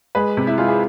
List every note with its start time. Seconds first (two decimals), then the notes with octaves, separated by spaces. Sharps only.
0.15 G#3 B4
0.37 C3
0.47 E4
0.58 G#3 F4
0.68 G#4